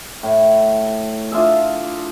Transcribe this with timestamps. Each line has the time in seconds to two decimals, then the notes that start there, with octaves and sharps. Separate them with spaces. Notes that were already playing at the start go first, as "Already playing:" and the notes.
0.23 A2
1.32 D4 F4 G#4 E5